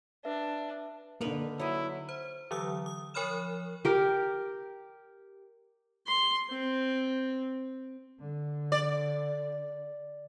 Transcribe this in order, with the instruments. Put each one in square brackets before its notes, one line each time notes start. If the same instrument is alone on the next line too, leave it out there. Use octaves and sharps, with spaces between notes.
[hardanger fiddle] D4 [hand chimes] B4 E5
[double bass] D3 [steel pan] A#3 D4 [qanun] D#4 A#4 B4
[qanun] F#3 D#5 [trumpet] E4
[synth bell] C5
D3 E3 F#3 D#6 E6
D#6
F3 A#4 C#5 B5 F6 E7
[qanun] G4 A#4
[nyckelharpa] C6
C4
[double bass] D3
[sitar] D5